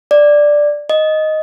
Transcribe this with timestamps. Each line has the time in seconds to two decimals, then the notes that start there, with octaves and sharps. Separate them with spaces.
0.11 D5
0.90 D#5